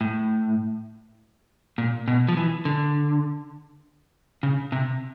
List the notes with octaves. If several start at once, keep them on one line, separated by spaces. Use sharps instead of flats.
A2
A#2
B2
F3
E3
D3
C#3
C3